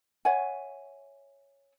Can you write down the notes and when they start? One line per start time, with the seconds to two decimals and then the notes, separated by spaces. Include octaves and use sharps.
0.25 C#5 E5 F#5 G#5